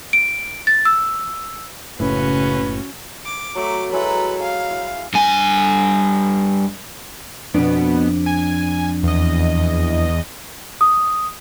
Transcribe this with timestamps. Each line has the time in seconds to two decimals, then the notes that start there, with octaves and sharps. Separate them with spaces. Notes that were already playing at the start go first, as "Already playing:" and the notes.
0.13 D7
0.67 A6
0.85 E6
2.00 F#1 A2 C#3 C#4 F#4 B4
3.25 D6
3.55 F#3 A3 D6
3.92 F#3 G#3 E4 A4 B4
4.40 F5 G#5
4.70 E4
5.14 G2 G#5
7.54 F2 B2 B3 D4
8.26 G#5
9.03 E2 D#5
10.81 D#6